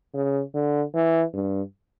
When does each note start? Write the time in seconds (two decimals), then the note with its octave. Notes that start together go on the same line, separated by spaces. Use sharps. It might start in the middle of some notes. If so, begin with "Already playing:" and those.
0.14 C#3
0.54 D3
0.94 E3
1.34 G2